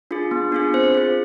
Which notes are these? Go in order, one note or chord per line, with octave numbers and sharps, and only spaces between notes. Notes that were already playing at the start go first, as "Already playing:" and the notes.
D4 F4 G#4
B3
D4 F4 G#4
C4 C5
F4 G#4